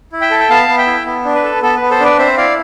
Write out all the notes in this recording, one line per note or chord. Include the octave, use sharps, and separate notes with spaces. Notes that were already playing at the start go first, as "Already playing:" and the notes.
E4
E5 G5
A4
G5
B3 F5 A5
B3
E5 G5
E4
B3
D4
B4
A4
B3 A4
B3 B4
A4 C5
D4 B4 D5
C4 C5 E5
E4 D5 F5